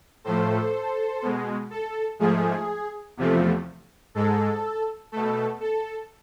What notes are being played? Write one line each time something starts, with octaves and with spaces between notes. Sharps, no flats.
A2 F3 A3 A4 C5
B2 G#3
A4
G#2 F3 A3 G#4
E2 C3 F3 A3
G#2 G#3 A4
B2 A3 A4
A4